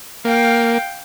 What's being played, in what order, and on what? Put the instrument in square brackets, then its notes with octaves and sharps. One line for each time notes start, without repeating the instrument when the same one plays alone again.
[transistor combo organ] A#3 [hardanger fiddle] F5 G5